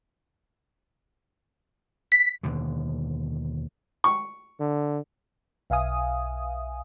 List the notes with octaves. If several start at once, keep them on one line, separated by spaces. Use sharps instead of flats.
B6
D#2 B2 D3
C#6
D3
B1 E5 F5 G#5 D#6